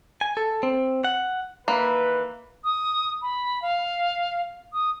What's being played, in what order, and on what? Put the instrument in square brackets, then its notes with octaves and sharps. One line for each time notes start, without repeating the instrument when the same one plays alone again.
[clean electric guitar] G#5
A4
C4
F#5
[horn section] D#3 E3 B4 [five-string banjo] A#3
[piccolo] D#6
B5
F5
D#6